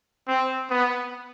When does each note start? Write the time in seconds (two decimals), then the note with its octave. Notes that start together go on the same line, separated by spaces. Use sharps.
0.28 C4
0.70 B3